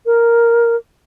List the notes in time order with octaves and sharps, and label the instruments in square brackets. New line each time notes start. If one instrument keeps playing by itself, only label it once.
[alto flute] A#4